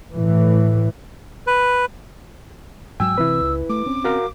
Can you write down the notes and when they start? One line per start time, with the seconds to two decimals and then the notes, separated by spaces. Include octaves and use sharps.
0.13 A2 E3
1.47 B4
3.00 G#2 F#3 G5 G#5 E6
3.18 C3 E3 C4 E4 B4
3.41 C#2
3.69 A3 D6
3.86 C4 C#4
4.04 F#4 A#4 F5